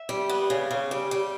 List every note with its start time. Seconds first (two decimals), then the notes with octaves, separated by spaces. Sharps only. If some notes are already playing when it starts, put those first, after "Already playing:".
Already playing: E5
0.09 G3
0.29 B3
0.50 C#3
0.71 C#3
0.91 G3
1.11 G3